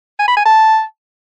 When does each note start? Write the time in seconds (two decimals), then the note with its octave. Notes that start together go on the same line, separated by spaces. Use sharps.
0.19 G#5
0.28 B5
0.37 G#5
0.45 A5